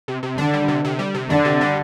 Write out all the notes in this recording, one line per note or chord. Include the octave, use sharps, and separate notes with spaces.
C3
C3
D3 D4
G3
C3
C3
G3
C3
D3 D4
C3
G3